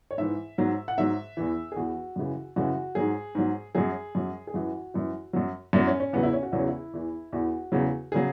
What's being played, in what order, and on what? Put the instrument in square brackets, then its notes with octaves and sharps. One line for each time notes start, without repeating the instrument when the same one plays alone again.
[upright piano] C#5
G#2 E3 E5
G#2 F#3
F#5
G#2 F#3 E5
E2 E3
G#4
E2 E3 F#4
F#2 C#3 E3
F#2 C#3 E3 F#4
G#2 F#3 G#4
G#2 F#3
F#2 F#3 G#4
F#2 F#3
G#4
F#2 E3 F#4
F#2 E3
F#2 F#3
F#2 F#3 E4
C#4
C#4
E2 C#3 F#3 B3
E4
C#4
F#4
E2 C#3 F#3 E4
C#4
E4
E2 E3
E2 E3 F#4
E2 C#3 F#3
C#3 F#3 G#4